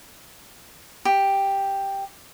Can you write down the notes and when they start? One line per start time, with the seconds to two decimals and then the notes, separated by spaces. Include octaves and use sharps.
1.05 G4